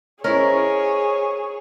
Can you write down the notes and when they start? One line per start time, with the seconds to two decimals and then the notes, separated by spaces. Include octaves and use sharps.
0.24 C#4 E4 G#4 A#4 C5 C#5 D#5